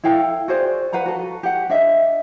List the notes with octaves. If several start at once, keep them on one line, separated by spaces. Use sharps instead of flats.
E4 A4 F5 G5
F#4 G#4 C5 D5
B4 F5 F#5 A#5
F#4 A4
G4 F#5
D4 D#5 E5